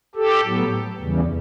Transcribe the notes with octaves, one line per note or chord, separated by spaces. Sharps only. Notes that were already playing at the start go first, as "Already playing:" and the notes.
G4 A4
A2 F#3 B3
E2 C#3 E3 G3